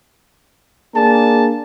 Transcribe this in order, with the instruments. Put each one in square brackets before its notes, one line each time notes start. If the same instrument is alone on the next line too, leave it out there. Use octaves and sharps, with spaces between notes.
[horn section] A#3 D4 G#4 A5